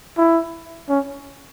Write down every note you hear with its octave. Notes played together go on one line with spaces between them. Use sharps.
E4
C#4